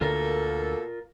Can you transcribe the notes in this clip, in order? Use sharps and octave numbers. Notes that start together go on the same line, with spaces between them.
D2 B2 D3 A#3 F4 A4 A#4